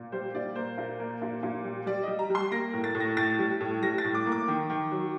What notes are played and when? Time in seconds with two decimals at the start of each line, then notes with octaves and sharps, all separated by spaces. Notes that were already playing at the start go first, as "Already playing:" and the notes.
Already playing: A#2
0.12 G3 C5
0.35 A#2 D5
0.55 A#3 C5
0.78 A#2
0.99 A#3
1.22 A#2
1.43 A#2
1.64 G3
1.86 G3 D5
2.03 G3 D#5
2.19 A#5
2.30 G3 C6
2.52 A#3 A#6
2.73 A2
2.84 A6
2.95 A2
3.00 A#6
3.17 A2 A6
3.39 G3
3.60 A2
3.82 G3 A#6
3.98 A6
4.04 A2
4.14 D6
4.26 A#3
4.32 D6
4.48 D#3
4.70 D#3
4.91 F#3